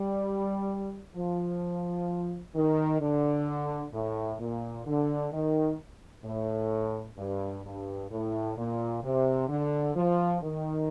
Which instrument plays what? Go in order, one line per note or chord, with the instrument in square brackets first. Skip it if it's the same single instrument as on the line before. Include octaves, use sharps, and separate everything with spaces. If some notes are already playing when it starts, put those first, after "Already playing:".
Already playing: [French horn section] G3
F3
D#3
D3
A2
A#2
D3
D#3
A2
G2
G2
A2
A#2
C3
D3
F3
D#3